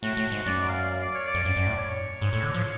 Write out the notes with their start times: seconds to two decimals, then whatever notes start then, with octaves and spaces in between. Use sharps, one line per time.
0.03 A2 F#4
0.17 A2
0.32 G#2
0.46 F#2 D5
0.68 F5
0.90 F5
1.02 D5
1.15 C#5
1.26 D5
1.34 F2
1.45 F#2
1.56 F#2
1.67 A2
1.78 C#5
2.22 G#2
2.33 A2
2.43 D3
2.54 F3